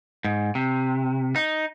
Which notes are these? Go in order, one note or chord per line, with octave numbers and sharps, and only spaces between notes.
G#2
C3
D#4